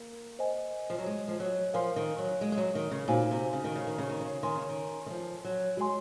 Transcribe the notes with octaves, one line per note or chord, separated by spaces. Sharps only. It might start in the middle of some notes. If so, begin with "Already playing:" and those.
Already playing: A#3
C5 D#5 G#5
F3
F#3
G#3
F3
F#3
F3 A#4 F5 G#5 C6
D#3
F#3
G#3
G#3
F#3
D#3
C#3
A#2 D#4 F#4 C5 F5 G#5
C3
C#3
D#3
C#3
D#3
C#3
D#3
C#3
D#3 C#5 G#5 C6
C#3
D#3
D#3
F3
F#3
G#3 F#4 C#5 G#5 C6